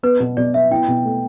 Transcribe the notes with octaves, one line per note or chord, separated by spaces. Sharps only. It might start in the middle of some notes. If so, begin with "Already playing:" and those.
B3 B4
B2
B2 D5
B3 E5
E4 G5
B2
A3